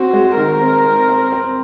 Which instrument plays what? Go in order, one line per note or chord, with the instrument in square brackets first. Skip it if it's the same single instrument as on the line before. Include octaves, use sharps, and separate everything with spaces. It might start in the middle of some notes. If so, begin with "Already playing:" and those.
Already playing: [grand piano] C4 [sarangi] F#4
[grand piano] G#3
[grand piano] D#3 [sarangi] A#4
[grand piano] C4
C4
C4
C4